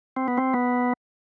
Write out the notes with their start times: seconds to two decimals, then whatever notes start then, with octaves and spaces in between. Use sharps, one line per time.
0.16 C4
0.28 B3
0.38 C4
0.54 B3